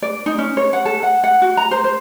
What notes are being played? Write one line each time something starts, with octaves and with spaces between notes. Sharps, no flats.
D5
D#4
C#4
C#5
F#5
A4
F#5
F#5
F#4
A#5
C5
C5